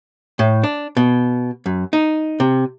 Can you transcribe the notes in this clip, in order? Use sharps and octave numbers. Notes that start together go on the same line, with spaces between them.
A2
D4
B2
F#2
D#4
C3